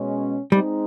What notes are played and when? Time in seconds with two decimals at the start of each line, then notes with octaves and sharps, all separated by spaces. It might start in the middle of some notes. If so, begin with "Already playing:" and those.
Already playing: B2 G#3 C#4
0.52 G3 G#3 C4 D#4